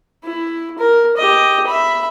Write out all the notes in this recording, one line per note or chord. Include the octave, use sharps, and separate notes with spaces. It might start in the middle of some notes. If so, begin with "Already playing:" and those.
E4
A#4
G4 D#5
E5 B5